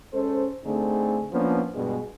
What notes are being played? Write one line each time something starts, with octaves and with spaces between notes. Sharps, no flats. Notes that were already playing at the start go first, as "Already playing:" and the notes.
G#3 C#4 A4 C5
D3 A3 C4 D#4 G#4
F3 A#3 B3 C#4 D4
G2 B2 G#3